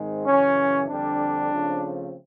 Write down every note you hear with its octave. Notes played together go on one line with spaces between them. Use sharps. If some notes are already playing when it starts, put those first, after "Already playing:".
Already playing: G#2 D#3 G#3 C4
F#2 C#3 E3 C#4
F2 D3 G3 C4 D4
C#3 F3 A3 C4